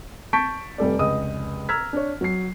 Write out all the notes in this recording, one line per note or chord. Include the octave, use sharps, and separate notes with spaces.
A5 C#6 G6 B6 D7
F1 G3 A4 D5
F1 C#2 D#5 D#6
A#5 E6 F6 G#6 B6
D4 C#5
F#3 C7